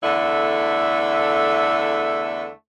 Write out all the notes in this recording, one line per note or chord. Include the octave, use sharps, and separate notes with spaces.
E2 D3 A3 E4